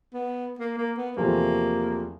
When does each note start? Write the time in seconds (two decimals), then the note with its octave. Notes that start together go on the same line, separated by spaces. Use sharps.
0.14 B3
0.59 A#3
0.78 A#3
0.97 B3
1.17 E2 C3 F3 A3 A#3